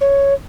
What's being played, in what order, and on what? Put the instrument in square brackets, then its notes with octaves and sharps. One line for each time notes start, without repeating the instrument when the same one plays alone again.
[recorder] C#5